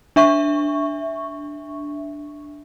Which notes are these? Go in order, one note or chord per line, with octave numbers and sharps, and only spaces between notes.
D4 E5 C#6